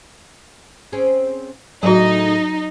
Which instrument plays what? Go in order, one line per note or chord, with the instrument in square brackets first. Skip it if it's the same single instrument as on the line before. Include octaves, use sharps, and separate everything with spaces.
[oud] C4 C#4 G#4
[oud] A2 E4 G#4 [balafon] F#3 F#4 [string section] D#4